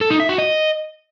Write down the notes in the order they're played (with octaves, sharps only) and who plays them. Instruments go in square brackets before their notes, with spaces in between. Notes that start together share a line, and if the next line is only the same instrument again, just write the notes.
[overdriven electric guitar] A4
D#4
E5
F#4
D#5